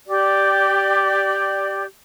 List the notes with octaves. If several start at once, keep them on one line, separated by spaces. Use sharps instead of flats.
G4 D5